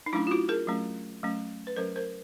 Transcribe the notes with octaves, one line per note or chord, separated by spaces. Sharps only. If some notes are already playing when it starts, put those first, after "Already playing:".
D#4
F#3 A3 C#4 D4 E4
F4
E4 F#4
G#4 A#4
F#3 A3 C#4
F#3 A3 C#4
B4
F#3 A3 C#4 A#4 C5
A#4 C5